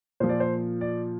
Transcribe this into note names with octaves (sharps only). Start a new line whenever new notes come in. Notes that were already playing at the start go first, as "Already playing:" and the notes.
A#2 F3 C5
D5
C5
D5